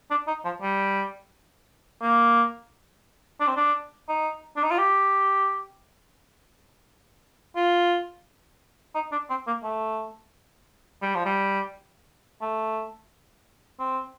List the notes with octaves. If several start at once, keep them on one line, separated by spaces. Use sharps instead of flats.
D4
D#4
F3
G3
A#3
D4
C4
D4
D#4
D4
D#4
F4
G4
F4
D#4
D4
C4
A#3
A3
G3
F3
G3
A3
C4